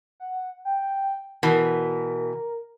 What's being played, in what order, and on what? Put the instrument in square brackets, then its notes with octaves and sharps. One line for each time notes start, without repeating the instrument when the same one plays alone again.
[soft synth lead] F#5
G5
[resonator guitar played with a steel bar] B2 E3 [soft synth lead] A#4